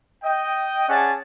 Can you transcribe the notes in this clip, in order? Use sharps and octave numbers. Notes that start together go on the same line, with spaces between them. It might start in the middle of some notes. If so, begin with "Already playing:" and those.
D#5 G5
C#4 G#4 D5 F#5 A5